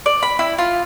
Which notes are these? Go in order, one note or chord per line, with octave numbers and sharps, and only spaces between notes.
D5
B5
E4
F4